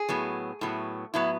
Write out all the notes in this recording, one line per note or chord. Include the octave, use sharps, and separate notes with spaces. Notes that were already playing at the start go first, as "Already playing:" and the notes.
Already playing: G#4
A2 F#3 B3
A2 F#3 B3
A2 F#3 B3 E4